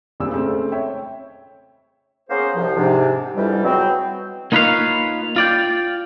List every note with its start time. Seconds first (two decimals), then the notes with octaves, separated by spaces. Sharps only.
0.20 A#1 E2 A#2 G3 C4 E6
0.32 C#3 G#3 A3 C4
0.72 C#5 E5 G5
2.30 A#3 B3 C#4 G#4 C5
2.56 C2 F3
2.76 G#2 C3 D4
3.36 F2 G#2 E3 G3
3.64 F#3 G#3 B3 C4
4.52 A#3 D#4 F4 B4 C#5 F5
5.36 F4 D5 G5